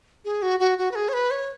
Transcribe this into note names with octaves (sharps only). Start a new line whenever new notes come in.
G#4
F#4
F#4
F#4
B4
G#4
C#5
B4
C#5